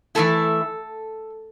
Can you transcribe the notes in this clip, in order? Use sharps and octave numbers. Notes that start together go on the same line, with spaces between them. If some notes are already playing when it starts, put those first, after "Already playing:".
E3 A3 E4 A4